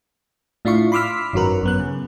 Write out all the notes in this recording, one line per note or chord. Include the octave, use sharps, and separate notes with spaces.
A2 D4 E4 F4 F5 C#6
B5 C6 D6 E6 F6 B6
G#1 F#2 F#3 F#4 A#4 B4
F#2 B3 F#6
C#3